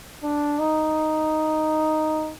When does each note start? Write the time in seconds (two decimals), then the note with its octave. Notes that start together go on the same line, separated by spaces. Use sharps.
0.24 D4
0.59 D#4